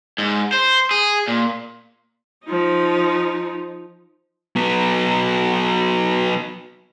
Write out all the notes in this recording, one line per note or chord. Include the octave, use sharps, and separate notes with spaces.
G#2
C5
G#4
A#2
F3 D#4
F#3 B3